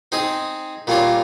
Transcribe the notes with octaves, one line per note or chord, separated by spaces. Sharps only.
C4 D#4 G#4
A#2 G3 A#3 C#4 F4